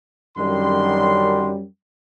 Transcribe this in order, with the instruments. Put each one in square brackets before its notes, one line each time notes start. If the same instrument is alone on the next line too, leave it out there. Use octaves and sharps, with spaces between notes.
[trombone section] F#2 G3 [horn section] D3 D#3 C6